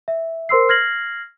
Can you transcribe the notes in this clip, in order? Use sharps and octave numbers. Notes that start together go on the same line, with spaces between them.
E5
A#4 C5 C6 E6 C7
F6 G#6 A#6 C7 F#7